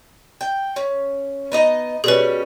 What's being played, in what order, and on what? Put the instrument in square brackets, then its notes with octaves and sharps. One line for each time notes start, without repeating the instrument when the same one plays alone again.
[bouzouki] G5
C#4
B3 D#4 D#5
[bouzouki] B2 G3 C#4 [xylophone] G#4 B4